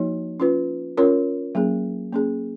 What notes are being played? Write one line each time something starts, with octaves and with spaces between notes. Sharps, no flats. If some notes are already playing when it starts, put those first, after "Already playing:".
Already playing: F3 A#3 D#4 F#4 C#5
C#4 F4 B4
C#4 F4 A#4 C#5
F#3 A#3 C#4 G#4
A#3 C#4 G#4